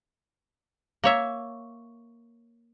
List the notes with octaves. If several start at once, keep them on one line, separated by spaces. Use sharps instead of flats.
A#3 C#5 E5